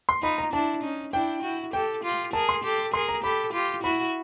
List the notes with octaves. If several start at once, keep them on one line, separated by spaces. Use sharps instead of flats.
C6
D#4 F4 B5
A#5
D4 E4 A5
C#4 D#4
D4 E4 G5
E4 F#4
G4 A4 G5
F4 G4
G#4 A#4 A5
C6
G4 A4
G#4 A#4 C6
A#5
G4 A4 B5
F4 G4
E4 F#4 B5